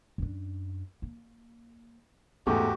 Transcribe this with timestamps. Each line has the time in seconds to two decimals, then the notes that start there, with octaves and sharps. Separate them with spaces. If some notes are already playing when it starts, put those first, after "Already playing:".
0.18 F#2 D4
1.02 A#3
2.47 D1 E2 G#2 A3 C#4 F#4 G4